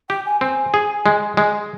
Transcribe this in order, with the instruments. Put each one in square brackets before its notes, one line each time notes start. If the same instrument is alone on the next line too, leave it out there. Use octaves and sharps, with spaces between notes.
[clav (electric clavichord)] G4 [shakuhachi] G5
[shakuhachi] G#5
[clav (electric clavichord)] C4 [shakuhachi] G#5
[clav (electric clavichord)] G#4
G#3
G#3